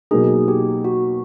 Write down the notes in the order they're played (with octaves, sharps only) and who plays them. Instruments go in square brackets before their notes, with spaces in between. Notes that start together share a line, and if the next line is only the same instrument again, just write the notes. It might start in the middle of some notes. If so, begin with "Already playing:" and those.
[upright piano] B2 F#3 A#3 D#4 [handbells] G#4
[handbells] G4
F#4